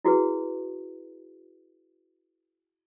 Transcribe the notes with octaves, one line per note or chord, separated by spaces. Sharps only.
E4 F#4 G#4 B4